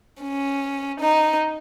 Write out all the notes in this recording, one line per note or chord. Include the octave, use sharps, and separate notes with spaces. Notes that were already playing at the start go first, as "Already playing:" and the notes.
C#4
D#4